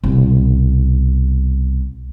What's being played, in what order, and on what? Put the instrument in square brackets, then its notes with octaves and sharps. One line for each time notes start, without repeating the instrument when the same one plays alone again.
[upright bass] C2 B2